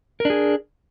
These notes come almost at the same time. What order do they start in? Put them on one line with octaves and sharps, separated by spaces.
A#4 D4 G#4